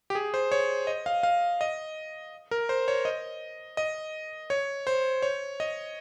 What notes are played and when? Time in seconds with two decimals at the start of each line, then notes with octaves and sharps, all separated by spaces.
0.10 G4
0.15 G#4
0.34 C5
0.52 C#5
0.87 D#5
1.06 F5
1.23 F5
1.61 D#5
2.51 A#4
2.69 C5
2.88 C#5
3.05 D#5
3.77 D#5
4.50 C#5
4.87 C5
5.22 C#5
5.60 D#5